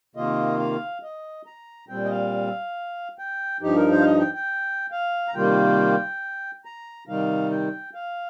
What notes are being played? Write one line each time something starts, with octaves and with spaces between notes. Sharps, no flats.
C3 D#3 A#3 F4 D#5
F5
D#5
A#5
A#2 G3 C4 G5
D#5
F5
G5
G2 F3 D#4 G4
A#4
C5
F5
D#5
G5
G5
F5
A#5
C3 D#3 G3 A#3 F4 G5
A#5
C3 D#3 G3 D#4 F5
G5
F5